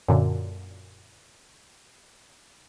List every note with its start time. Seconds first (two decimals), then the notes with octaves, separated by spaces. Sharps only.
0.09 F#2 A#2 D3